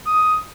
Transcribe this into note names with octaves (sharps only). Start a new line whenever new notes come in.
D#6